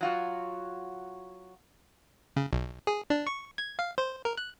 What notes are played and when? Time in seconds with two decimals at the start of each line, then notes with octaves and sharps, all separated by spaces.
0.01 F#3 F4 F#4
2.36 C#3
2.53 B1
2.87 G#4
3.10 D4
3.27 C#6
3.58 G#6
3.79 F5
3.98 C5
4.25 A#4
4.37 F#6